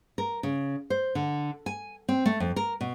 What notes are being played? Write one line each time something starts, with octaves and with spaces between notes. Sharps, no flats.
A#4
C#3
C5
D3
G#5
C4
A3
F2
A#4
B2